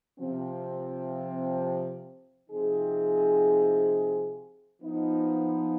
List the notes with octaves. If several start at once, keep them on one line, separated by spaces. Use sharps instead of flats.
C3 F3 C4
C3 F3 C4 D#4 G#4
F3 B3 D#4